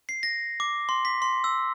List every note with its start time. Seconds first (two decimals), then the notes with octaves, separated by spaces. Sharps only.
0.09 C7
0.23 A#6
0.60 D6
0.89 C6
1.05 B6
1.22 C6
1.44 E6